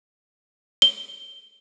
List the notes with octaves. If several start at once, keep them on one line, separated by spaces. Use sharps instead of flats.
G7